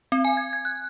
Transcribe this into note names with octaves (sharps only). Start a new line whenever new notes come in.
C4
G#5
G#6
G#6
F#6